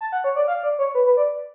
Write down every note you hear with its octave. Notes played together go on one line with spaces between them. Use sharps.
A5
F#5
C#5
D5
F5
D5
C#5
B4
B4
D5